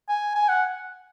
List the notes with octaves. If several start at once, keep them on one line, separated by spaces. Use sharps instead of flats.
G#5
G#5
F#5